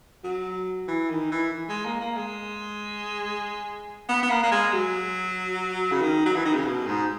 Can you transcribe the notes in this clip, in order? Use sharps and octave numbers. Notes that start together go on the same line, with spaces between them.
F#3
E3
D#3
E3
G#3
A#3
A#3
G#3
B3
B3
A#3
A#3
G#3
F#3
C#3
D#3
F#3
E3
D#3
C#3
B2
G#2